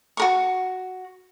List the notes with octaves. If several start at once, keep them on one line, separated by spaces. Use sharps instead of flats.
F#4 A#4 C#6